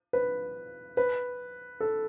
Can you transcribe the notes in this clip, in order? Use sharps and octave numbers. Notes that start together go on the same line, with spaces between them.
B4
B4
A4